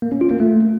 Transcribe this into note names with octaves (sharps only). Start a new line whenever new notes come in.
A#3
C#4
F4
A#3
A3